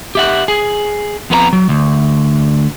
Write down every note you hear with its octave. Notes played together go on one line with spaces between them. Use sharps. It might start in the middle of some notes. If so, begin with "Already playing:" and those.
G4 E5 F#5
G#4
F2 B3 B4 A#5
F#3
D2